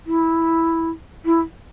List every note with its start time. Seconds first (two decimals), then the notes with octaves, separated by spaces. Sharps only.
0.06 E4
1.25 E4